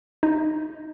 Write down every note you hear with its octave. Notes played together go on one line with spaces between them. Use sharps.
D#4